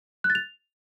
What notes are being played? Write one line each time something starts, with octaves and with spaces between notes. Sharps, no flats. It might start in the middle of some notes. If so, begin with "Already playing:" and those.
F#6
A6
F7